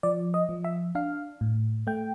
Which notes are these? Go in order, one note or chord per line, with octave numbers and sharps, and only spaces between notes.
F3 D5
D#5
F3
E5
D4 F5
A2
A3 G5